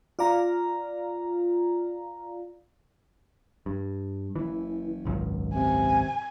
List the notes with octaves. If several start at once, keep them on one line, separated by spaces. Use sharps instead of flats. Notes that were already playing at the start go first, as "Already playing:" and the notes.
F4 D5 F5 A#5
G2
F#1 E3
G#1 C#2 F#2
C3 G#5